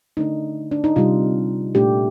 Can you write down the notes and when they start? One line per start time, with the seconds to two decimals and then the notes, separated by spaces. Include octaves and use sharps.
0.17 D3 A3 D4 D#4
0.71 D4
0.84 D#4
0.96 C3 G3 C4 F4
1.75 A#2 A3 D4 G4